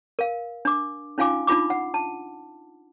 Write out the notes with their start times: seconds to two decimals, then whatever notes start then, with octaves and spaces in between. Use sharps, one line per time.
0.19 A#4 F5
0.65 D4 D6
1.18 C#4 D#4 F4 F5 G#5 D6
1.47 D4 D#4 F4 B5 D6
1.70 F#5
1.94 A5